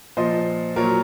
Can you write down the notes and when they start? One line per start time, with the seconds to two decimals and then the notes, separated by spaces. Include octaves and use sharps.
0.17 A#2 F3 C5 D#5
0.76 A#2 F#3 A#4 C#5